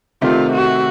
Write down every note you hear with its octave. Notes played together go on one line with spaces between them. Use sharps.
C3 D#3 A3 C4 F4
F#4